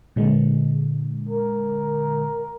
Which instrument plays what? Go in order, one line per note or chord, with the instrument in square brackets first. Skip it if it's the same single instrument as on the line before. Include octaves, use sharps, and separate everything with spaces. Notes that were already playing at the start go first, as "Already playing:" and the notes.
[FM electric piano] A#2 D3 G#3
[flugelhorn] A#4